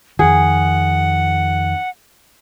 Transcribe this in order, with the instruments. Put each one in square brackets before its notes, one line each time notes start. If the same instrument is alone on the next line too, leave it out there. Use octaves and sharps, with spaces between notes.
[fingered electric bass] F2 D#3 [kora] G#4 [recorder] F#5